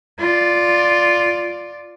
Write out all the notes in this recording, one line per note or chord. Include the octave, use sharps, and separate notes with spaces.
F4 D5